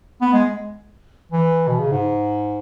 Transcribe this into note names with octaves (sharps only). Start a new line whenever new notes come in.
B3
G#3
E3
B2
C#3
G#2